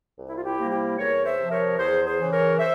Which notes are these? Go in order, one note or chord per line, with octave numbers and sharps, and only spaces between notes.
C2
E4
F4
E4 G4
C3 G3 A#3
E4 G4
E2 A#4 C#5
C5 E5
C3 F3
A#4 C#5
E2 G#4 C5
G#4 C5
C#3 E3
A#4 C#5
C5 E5